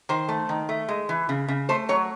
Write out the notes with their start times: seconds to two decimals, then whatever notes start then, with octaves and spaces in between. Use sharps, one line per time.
0.09 D#3 C5
0.28 A3
0.49 D#3
0.69 A3
0.89 G#3
1.09 E3
1.29 C#3
1.48 C#3
1.69 A3 C5
1.89 F#3 C#5